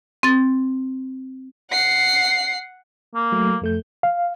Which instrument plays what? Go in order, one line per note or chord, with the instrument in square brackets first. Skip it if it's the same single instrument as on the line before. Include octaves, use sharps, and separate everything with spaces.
[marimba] C4 A6
[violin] F#5 C7
[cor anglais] A#3
[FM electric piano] F#3 A3
F2 A3 G6
[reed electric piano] F5